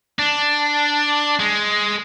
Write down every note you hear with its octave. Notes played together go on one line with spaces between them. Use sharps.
D4
G#3